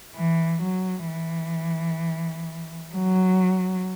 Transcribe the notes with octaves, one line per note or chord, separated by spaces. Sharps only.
E3
F#3
E3
F#3